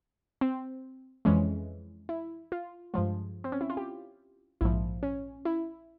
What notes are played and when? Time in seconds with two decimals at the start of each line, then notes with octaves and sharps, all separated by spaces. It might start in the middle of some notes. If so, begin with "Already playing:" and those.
0.41 C4
1.25 F2 E3 G#3 C#4
2.09 E4
2.52 F4
2.94 G2 F3 G#3 F4
3.44 C4
3.52 C#4
3.61 E4
3.70 F4
3.77 G4
4.61 A#1 G#2 F3 E4
5.03 C#4
5.45 E4